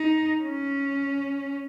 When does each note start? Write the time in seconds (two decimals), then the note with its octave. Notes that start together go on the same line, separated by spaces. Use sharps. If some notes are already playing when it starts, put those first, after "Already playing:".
Already playing: D#4
0.42 C#4